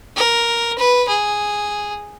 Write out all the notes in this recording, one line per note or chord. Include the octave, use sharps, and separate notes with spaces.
A#4
B4
G#4